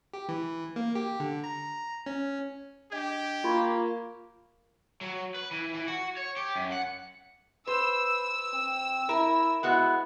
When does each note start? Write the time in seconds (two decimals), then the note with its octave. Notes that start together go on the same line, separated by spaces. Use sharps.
0.14 G4
0.29 E3
0.76 A#3
0.95 G4
1.20 D3
1.44 A#5
2.06 C#4
2.92 D4 G4 D#5 G#6
3.44 A#3 F4 B5 C#6 G#6
5.01 F#3
5.35 B4
5.51 E3
5.74 E3
5.87 F#4
6.17 C#5
6.37 G4
6.56 F#2
6.72 F#5
7.67 B4 C5 E6
8.53 C4
9.09 E4 A#4
9.63 G#3 B3 E4 F#4